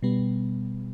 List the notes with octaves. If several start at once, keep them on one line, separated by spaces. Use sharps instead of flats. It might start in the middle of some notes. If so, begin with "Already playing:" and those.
B2 G3 B3